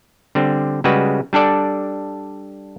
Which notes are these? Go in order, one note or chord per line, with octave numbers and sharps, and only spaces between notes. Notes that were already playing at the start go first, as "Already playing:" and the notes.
D3 G3 C4
C#3 G3 G#3 F#4 B4
G3 D4 A4 D5